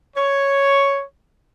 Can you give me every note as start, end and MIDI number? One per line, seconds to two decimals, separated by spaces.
0.16 1.02 73